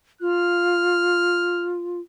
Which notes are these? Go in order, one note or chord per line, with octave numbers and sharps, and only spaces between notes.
F4 F6